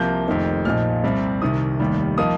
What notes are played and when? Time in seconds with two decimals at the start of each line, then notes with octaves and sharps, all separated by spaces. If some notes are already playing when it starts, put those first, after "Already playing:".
Already playing: C2 C3 F3 A#3 G6
0.28 F1 F2 D#3 A#3 D#4
0.65 A#1 A#2 F3 D#4 F6
1.04 C2 C3 G3 C4
1.42 C2 C3 D#3 D#6
1.80 F1 D#2 D#3 G3
2.18 F3 A#3 D#4 D#6